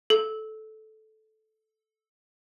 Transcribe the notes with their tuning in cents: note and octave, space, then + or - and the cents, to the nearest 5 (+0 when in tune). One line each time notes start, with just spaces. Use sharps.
A4 -10